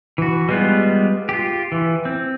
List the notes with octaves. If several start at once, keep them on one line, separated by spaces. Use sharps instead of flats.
E3 F#4
G3 G#3 B3 F4
F4 G4
E3
C4